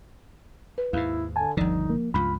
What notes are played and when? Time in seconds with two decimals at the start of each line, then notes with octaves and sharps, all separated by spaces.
0.78 B4
0.93 D#2 G#2 E4 F5
1.36 D3 G#5 A5
1.57 G1 D#2 D3 F3 D#4 D5
1.90 A#3
2.14 C#2 G2 F4 B5